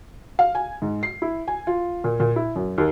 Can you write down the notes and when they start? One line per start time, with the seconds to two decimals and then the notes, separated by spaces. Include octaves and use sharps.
0.39 F5
0.55 G#5
0.82 G#2
1.03 C7
1.22 E4
1.48 G#5
1.67 F4
2.04 A#2
2.20 A#2
2.36 E4
2.56 F#2
2.78 D#2